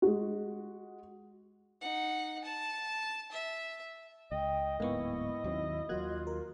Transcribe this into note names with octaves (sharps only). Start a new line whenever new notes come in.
G#3 F#4
D#4 F#5
A5
E5
C#2 D#5 G5
D1 E2 G#2 A#3 B3 E4 C#6
D#2 D#3 F#3 C4
D#2 F#3 A#3 F4 F#4 F#6 G#6
A#4